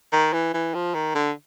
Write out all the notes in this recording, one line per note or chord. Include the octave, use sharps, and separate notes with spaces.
D#3
E3
E3
F3
D#3
D3